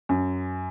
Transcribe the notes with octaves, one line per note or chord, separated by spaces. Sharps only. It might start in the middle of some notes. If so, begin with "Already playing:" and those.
F#2